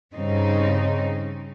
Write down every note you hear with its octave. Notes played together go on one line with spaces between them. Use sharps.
G2 C#3 C4 D#4